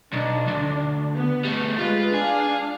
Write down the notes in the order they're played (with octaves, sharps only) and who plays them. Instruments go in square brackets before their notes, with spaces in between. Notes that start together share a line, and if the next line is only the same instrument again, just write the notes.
[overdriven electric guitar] B1 [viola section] D4
[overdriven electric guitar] D2
[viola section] B3
[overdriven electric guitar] G3 A3
[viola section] G#3 B4 [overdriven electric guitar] F4
[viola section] D4 F5 [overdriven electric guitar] G#4